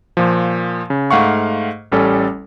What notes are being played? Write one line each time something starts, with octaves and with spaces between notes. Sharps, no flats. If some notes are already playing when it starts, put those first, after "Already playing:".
A#2 F3
C#3
G#2 A3 F5 F#5 C#6
A1 G3 C#4 A4